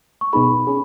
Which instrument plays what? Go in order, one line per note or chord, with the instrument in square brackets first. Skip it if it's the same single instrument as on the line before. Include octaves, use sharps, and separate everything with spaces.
[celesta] C#6
[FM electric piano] B2 B3 D#4 G#4 [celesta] B5
[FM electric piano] C#4 G#4